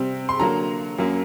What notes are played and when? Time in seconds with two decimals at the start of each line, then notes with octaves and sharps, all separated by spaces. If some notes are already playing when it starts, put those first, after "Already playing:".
Already playing: C3 G3 C4
0.29 C6
0.40 D3 F#3 A#3 A#5
0.98 F#2 F#3 A#3